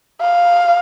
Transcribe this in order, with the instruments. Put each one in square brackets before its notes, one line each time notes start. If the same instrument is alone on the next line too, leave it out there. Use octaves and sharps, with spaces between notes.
[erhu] F5